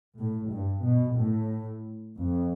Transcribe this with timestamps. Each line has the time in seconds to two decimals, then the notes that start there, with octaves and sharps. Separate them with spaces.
0.16 A2
0.50 G2
0.83 B2
1.16 A2
2.17 F2